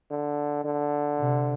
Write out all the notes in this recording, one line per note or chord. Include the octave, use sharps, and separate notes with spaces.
D3
D3
C3